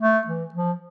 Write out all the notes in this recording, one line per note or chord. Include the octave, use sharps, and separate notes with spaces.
A3
E3
F3